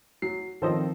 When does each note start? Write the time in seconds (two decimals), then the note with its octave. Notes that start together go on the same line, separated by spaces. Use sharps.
0.22 F#3 C7
0.62 D#3 F3 C4 A4 C5 D#5